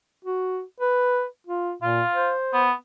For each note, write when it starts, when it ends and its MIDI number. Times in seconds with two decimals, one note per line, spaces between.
0.25 0.62 66
0.80 1.25 71
1.47 1.73 65
1.82 2.02 46
1.82 2.32 65
2.13 2.65 72
2.53 2.72 59